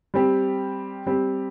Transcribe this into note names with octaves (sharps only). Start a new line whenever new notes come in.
G3 C4 G4
G3 C4 G4